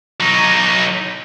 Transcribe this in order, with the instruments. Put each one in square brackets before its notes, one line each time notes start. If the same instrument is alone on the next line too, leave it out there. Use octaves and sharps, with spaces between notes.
[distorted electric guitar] F#3 D#4